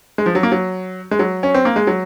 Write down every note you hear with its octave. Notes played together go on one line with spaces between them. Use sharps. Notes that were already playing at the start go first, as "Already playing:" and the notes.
G#3
F3
F#3
A#3
F#3
G#3
F#3
C#4
C4
A#3
G#3
F#3